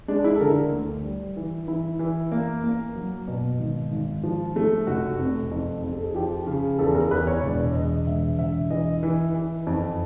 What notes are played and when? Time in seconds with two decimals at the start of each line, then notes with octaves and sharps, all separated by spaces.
0.08 G#3 D4
0.24 E4
0.36 A4
0.40 D3 A#4
0.72 D2
1.04 G3
1.36 E3
1.68 E3 E4
1.99 E3
2.32 A#3
2.64 A#3
2.95 F#3
3.28 B2
3.59 G#1
3.92 G#1
4.24 F3
4.56 A3
4.87 F1 F#4
5.19 C3
5.51 F2
5.84 F2
5.92 A4
6.04 G#4
6.15 F3 G4
6.47 C#3
6.79 E2 A4
6.95 A#4
7.11 E2 B4
7.27 C#5
7.43 E1 D5
7.75 E1 D#5
8.07 E1 E5
8.38 E1 E5
8.70 E3 D#5
9.03 E3
9.34 E3
9.67 F2